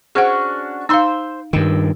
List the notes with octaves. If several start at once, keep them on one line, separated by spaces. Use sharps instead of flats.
C#4 D4 F#4 G#4 C5 F#5
D#4 C5 F5 C6 E6
G2 D#3 E6